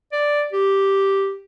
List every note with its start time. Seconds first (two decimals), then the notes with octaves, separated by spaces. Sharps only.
0.12 D5
0.52 G4